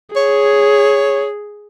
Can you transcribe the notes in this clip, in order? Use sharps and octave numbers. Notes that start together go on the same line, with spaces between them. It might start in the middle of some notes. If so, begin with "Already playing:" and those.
G#4 C#5